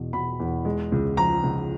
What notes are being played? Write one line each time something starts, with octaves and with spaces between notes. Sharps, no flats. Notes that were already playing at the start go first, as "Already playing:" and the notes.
Already playing: E2 B2
B2 B5
E2
G#3
C#2
F3 A#5
C#2